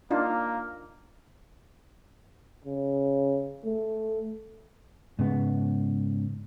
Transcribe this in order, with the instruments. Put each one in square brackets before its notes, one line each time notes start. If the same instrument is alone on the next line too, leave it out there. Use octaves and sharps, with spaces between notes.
[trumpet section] A#3 [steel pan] D4 D#4 F4
[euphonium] C#3
A3
[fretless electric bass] G#2 C#3 B3